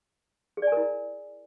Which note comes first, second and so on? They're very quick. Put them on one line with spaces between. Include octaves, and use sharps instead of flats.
G#4 D5 G#5 A#4 E4